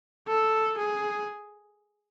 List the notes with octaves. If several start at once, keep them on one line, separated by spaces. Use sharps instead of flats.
A4
G#4